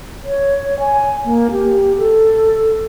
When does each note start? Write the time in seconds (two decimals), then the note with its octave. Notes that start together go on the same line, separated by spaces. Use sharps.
0.24 C#5
0.80 G#5
1.25 A#3
1.51 G4
1.98 A4